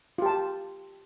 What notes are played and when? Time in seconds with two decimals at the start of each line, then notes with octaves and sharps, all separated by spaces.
0.18 F4
0.22 G4
0.26 A5